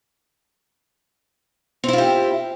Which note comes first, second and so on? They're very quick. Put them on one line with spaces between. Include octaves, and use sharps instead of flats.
C4 E4 F4 G4